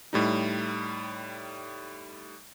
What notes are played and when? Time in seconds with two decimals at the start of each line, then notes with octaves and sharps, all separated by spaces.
0.13 A2 G3 D#4